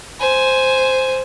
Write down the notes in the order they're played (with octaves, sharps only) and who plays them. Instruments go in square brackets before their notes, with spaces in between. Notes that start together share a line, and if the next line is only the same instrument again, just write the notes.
[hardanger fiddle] C5 G#5